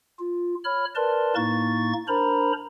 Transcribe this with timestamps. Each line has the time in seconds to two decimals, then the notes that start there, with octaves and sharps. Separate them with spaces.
0.19 F4
0.65 C#5 B5 F6
0.95 A#4 B4 D5 A5 C6
1.36 A2 A#3 D#4 C#6 A6
2.08 D4 A#4 C5 A#5 B5